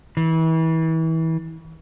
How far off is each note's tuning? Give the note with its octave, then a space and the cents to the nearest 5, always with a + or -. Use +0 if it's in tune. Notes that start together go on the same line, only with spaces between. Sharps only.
E3 -30